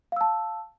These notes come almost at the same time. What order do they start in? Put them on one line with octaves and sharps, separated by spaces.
F5 E6 A5